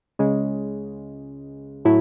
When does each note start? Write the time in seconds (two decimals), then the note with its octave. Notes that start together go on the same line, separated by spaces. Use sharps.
0.19 C#2 C#3 G#3
1.85 A2 F#3 A3 E4